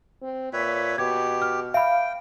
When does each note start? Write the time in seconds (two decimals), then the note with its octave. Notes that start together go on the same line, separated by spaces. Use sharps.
0.22 C4
0.53 A#2 B4 C#5 E5
0.98 B2 G4 G#6
1.42 F6
1.74 E5 F5 G5 B5